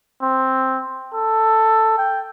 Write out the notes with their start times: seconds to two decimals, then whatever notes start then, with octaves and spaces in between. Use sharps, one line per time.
0.22 C4
1.14 A4
1.98 G5